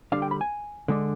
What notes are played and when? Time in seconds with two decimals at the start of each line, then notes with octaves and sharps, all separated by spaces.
0.12 D3 G3 D4 F5
0.22 G5
0.31 B5
0.41 G#5
0.88 D3 G#3 D4